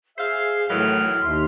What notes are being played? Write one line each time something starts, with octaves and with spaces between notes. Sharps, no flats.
G#4 C5 E5 F5
A2 D#3 E3 F#3 E4 F6
D#2 E5 C6